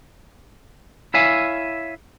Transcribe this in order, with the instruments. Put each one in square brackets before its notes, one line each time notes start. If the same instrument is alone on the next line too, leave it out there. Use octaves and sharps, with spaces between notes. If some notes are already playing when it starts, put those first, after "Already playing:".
[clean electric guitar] E4 C#5 E5 F5 G#5